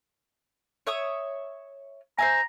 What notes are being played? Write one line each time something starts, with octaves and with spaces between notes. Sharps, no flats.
C#5 E5 D#6
C5 E5 G#5 A#5